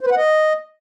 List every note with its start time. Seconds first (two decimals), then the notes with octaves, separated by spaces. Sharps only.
0.01 C5
0.06 B4
0.11 F#5
0.17 D#5